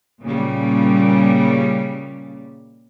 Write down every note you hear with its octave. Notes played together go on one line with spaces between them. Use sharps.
A#2 C#3 G3